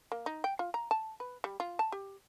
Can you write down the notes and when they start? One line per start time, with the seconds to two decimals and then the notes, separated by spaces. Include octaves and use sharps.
0.12 A#3
0.26 D#4
0.44 G5
0.59 F4
0.74 A#5
0.91 A5
1.20 B4
1.44 G3
1.60 F4
1.79 A5
1.92 G4